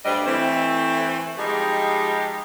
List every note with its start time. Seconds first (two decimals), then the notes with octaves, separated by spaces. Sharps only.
0.04 D2 G2 G3 D4 C5 D#5
0.26 E3 A3 C4
1.37 F3 G3 G#3 D#4 G4